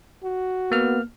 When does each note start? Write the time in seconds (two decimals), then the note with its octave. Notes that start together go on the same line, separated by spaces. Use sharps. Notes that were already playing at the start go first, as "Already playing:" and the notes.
0.24 F#4
0.72 A#3 B3 F6